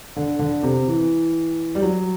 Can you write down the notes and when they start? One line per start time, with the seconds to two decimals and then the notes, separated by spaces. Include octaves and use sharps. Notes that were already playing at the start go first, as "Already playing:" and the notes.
0.16 D3
0.39 D3
0.63 C3
0.88 E3
1.75 G3
1.82 F#3